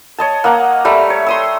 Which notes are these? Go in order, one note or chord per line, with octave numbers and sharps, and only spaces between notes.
C#5 D#5 A5
A#3 D#5 F#5 A#5
G3 A3 A#5
C#5
C6 D#6 E6